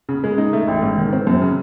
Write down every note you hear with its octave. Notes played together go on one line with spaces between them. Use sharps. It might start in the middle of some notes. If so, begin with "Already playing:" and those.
C#3
G#3
D#4
A3
A1
G#2
D#3
C4
F#2
C#3